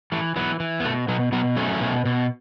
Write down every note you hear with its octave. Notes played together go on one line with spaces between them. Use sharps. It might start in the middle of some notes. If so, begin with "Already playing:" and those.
E3 A3
E3 F#3 B3
E3
B3
B2 A3
B2 F#3 B3
B2 F#3 B3
F#3 A3 C#4
B2
B2